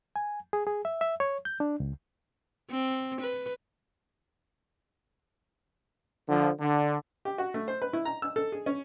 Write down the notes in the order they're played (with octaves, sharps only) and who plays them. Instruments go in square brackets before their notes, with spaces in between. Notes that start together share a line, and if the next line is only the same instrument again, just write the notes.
[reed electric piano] G#5
G#4
G#4
E5
E5
C#5
G6
D4
C#2
[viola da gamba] C4
B4
[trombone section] D3 F3
D3
[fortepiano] G4
F#4
A3
C5
B4
E4
A#5
E6
A4
G#4
C#4